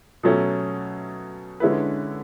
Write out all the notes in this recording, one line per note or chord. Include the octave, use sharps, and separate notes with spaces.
B2 F#3 A3 C#4
D3 G#3 C#4 E4 B4